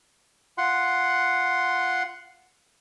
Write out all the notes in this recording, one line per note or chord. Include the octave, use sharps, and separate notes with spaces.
F4 F#5 C6